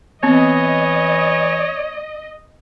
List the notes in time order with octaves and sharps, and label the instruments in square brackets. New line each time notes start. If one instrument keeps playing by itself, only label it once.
[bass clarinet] E3 [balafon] B3 C4 [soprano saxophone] C#5 [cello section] D#5